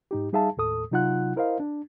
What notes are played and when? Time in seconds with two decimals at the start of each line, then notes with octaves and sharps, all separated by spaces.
0.11 G#2 D#4 G4
0.33 G3 D#4 G#4 E5 F5 A5
0.57 D#2 A2 A4 D#6
0.91 C3 F#3 D#4 F4 F#5 F#6
1.36 E4 A#4 C5 D#5 F5
1.60 D4